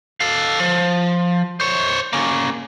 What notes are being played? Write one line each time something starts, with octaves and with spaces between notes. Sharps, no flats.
A4 F5
F3
C5 C#5
A#3 C#4